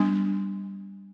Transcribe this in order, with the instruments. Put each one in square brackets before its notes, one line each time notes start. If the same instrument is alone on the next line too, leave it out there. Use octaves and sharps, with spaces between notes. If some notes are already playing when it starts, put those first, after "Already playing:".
Already playing: [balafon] G3 B3 D4